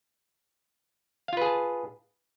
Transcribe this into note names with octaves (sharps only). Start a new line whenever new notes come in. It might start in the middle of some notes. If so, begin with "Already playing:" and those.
F4 G#4 B4 F5 A5